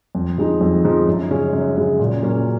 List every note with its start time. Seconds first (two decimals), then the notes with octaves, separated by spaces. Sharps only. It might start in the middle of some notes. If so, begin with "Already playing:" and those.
0.15 F2
0.38 F3 G#3 D#4
0.61 F2
0.84 F3 G#3 D#4
1.07 F#2
1.30 C#3 G#3 C#4
1.53 F#2
1.76 C#3 G#3 C#4
1.99 A#2
2.23 F#3 A#3 C#4